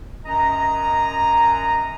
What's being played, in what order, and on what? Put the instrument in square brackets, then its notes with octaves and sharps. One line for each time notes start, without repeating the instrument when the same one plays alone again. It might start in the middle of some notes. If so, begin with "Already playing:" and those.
[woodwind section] F#2 D#5 A#5